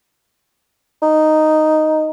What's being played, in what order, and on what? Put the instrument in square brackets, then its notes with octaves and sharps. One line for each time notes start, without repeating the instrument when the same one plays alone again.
[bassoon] D#4